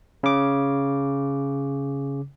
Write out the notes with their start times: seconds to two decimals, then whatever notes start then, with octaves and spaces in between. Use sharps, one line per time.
0.23 C#3 D6